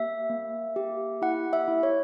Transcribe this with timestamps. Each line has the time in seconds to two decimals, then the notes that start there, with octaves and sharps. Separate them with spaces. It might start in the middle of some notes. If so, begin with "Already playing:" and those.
Already playing: A#3 G4 E5
0.30 A#3
0.76 G4
1.22 E4 F#5
1.53 E5
1.68 E4
1.83 C#5